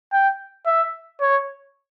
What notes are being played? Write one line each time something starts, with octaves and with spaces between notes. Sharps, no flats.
G5
E5
C#5